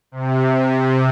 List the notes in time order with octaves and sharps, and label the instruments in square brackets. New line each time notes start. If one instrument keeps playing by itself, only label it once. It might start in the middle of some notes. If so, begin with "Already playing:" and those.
[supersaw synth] C3